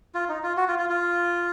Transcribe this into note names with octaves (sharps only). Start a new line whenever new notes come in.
F4
D#4
F4
F#4
F4
F4
F4